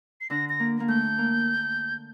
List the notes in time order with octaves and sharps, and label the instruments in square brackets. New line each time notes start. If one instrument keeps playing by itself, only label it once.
[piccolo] C7
[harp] D3 D4 [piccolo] A#6
[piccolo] A#6
[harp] A#3
A#3
[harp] A3 [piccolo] G6
[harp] A#3